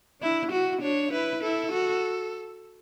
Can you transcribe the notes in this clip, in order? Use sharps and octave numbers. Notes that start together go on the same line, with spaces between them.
D4 E4
E4 F#4
D4 C#5
E4 B4
E4 A4
F#4